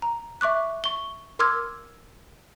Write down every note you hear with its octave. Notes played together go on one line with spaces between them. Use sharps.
A#5
E5 C#6 D6 F#6
C#6 G7
A#4 C6 D6 E6 F6 G#6